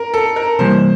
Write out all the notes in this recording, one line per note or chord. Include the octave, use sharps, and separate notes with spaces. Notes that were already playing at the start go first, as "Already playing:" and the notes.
Already playing: A#4
A4
A#4
C3 E3 G3 A#3 C5